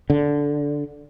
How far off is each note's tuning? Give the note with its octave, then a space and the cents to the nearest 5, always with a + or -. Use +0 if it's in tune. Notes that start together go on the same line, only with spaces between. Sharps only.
D3 -10